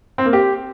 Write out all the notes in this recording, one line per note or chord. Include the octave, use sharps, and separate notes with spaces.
C4
A#3
G4